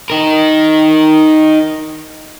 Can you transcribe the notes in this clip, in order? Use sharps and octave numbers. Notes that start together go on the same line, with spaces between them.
D#4 A#4